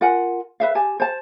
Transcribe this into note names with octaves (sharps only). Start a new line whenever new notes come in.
F4 A#4 F#5 G#5
B4 E5 F5
G4 G#5 A5
C5 A5